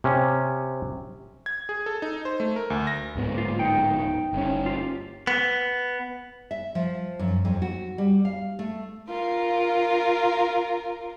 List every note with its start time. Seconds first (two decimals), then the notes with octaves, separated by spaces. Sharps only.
0.04 C3 C#4
1.46 G#6
1.69 G#4
1.86 A4
2.02 D#4
2.25 C5
2.40 A3
2.56 A#4
2.70 D2
2.87 A#6
3.15 D1 G#2 B3
3.34 A#3 F4
3.59 D#4 G5
4.33 G1 C#4
4.66 F4 G4
5.27 B3
6.51 E5
6.75 F3
7.19 F#2
7.45 F2
7.62 F#4
7.98 G3
8.25 F5
8.59 A3
9.09 F4 A#4